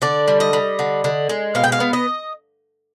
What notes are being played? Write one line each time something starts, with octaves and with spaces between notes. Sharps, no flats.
D3 D5
G3
D#5
G3
D3
D3
G#3
B2 F5
G5
F5
B3
D#5